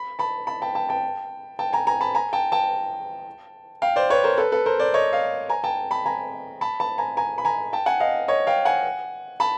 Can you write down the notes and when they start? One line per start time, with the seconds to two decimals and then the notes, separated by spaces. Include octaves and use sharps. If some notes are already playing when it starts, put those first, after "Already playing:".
Already playing: B5
0.19 A5 B5
0.47 A5 B5
0.62 G5 A5
0.75 G5 A5
0.89 G5 A5
1.59 G5 A5
1.73 G#5 A#5
1.87 G#5 A#5
2.01 A5 B5
2.15 G#5 A#5
2.33 G5 A5
2.52 G5 A5
3.82 F5 G5
3.96 C5 D5
4.10 B4 C#5
4.24 A#4 C5
4.38 A4 B4
4.52 A4 B4
4.66 A#4 C5
4.80 C5 D5
4.94 C#5 D#5
5.12 D#5 F5
5.49 G#5 A#5
5.64 G5 A5
5.91 A5 B5
6.06 G#5 A#5
6.61 A5 B5
6.80 A5 B5
6.98 G#5 A#5
7.17 G#5 A#5
7.38 B5
7.45 G#5 A#5
7.73 G5 A5
7.86 F#5 G#5
8.00 D#5 F5
8.28 C#5 D#5
8.47 F5 G5
8.65 F#5 G#5
9.40 A5 B5